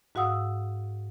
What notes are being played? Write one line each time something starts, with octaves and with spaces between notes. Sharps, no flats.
G#2 F#4 F5 F#5 D#6 E6